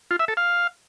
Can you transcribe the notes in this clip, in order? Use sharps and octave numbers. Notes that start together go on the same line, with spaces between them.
F4
E5
A4
F5